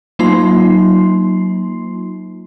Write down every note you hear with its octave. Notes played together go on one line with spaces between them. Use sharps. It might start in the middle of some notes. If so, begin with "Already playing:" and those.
F#3 A#3 D#4 F4 C6 C7